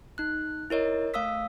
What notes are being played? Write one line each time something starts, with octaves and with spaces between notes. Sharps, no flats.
D#4 F#6
E4 A#4 C#5 D#5
A3 F5 D#6 E6 B6